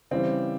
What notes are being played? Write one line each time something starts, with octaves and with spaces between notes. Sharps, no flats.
C#3 E3 G3 C4